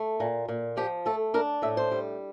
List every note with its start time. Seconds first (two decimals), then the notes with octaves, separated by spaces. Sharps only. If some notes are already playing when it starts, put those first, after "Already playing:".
Already playing: A3
0.20 A#2
0.48 A#2
0.77 F3 G4
1.06 A3 A4
1.34 D4 A#4
1.62 A2 E5
1.77 C5
1.91 G3